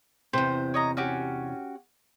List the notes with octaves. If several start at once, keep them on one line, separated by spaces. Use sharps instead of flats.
E2 C3 C5
C#5 D#5 A#5
C#4 F#4 G4